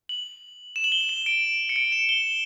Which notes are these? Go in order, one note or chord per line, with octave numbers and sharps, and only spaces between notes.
F#7
E7
F#7
G7
F#7
E7
D7
C#7
D7
E7
G7